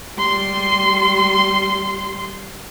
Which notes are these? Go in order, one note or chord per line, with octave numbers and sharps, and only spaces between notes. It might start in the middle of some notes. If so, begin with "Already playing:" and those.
G3 C6